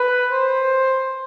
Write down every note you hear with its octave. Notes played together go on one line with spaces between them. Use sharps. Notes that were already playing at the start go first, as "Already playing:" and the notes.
Already playing: B4
C5